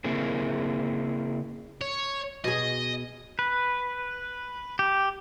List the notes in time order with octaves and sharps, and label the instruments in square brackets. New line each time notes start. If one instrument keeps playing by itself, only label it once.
[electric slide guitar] C#3 A#3 C4 E4 G#4 A#4
[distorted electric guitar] C#5
[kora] B2 G#4 [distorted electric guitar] D#5
[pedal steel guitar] B4
G4